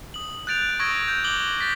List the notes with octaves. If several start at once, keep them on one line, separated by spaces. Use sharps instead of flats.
D#6 F#7
F#6 G6 A6 D7 F7
C#6 D#6 E6 G#6 A#6 D7
G6
D6 F#7 G7
G6 A6 B6